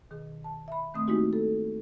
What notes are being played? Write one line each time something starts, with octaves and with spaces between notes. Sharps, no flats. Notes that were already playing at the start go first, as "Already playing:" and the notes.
B2 D#3 G#4
A5
E5 B5
D#3 A3 C4 D#6
G#3 A#3 D#4 E4 F#4 G4
A4